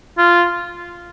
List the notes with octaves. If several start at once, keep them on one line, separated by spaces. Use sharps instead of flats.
F4